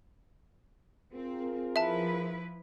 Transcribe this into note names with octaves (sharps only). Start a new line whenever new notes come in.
C4 F4 G#4 A#4
F3 E4 B4 E5 A5